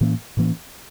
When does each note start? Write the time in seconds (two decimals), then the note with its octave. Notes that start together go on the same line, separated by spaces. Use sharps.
0.01 A2 E3 A#3 C#4
0.37 A2 E3 A#3 C#4